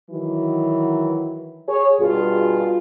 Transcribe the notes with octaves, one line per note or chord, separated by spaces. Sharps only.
D#3 E3 F#3
G#4 C#5
G2 B2 F4 G#4